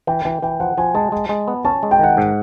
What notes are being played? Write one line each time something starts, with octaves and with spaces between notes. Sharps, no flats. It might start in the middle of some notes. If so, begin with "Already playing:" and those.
E3 G5
E3 G5
E3 G5
F3 F#5
F3 G#5
G#3 A5
G#3
G#3
B3
C#4 A5
G#3
G5
D#3 F#5
G#2